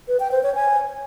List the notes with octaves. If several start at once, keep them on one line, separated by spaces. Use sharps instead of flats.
B4
G5
C5
C#5
G#5